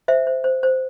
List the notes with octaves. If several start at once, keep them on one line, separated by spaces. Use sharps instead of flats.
C5 E5
C5
C5
C5